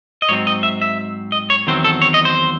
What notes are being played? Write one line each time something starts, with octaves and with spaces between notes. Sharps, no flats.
D#5
G#2 F#3 C4 C#5
D#5
E5
E5
D#5
C#5
E2 D#3 F#3 C4 C5
A4
C#5
D#5
C5